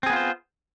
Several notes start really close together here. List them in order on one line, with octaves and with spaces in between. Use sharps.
C4 G#4 B3 F4 C5